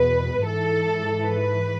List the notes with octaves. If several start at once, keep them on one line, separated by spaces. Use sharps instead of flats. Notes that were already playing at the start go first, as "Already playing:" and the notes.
Already playing: E2 B2 B4
G#2 E3 A4
B4